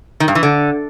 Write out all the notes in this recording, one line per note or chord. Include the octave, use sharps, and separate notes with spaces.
D#3
G2
E3
D3